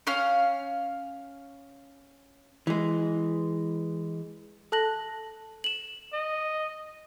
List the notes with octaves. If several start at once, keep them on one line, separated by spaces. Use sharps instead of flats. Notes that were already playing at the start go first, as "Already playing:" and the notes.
C#4 F5 F6
E3 G#3
A4 A5 F#6 A#6 F#7
E7 F#7
D#5